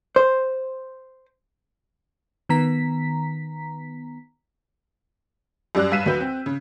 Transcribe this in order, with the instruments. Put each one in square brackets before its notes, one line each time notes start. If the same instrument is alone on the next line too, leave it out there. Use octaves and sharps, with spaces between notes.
[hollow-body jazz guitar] C5
[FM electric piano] D#3 B3 A#5 B6
[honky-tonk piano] F#2 G3 D5 E6 F#6
G2 F5 B6 D#7 E7
D2 F#3 B4 G6
C4
C#3